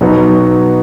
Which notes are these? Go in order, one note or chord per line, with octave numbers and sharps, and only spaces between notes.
B2 F#3 B3 D#4 F#4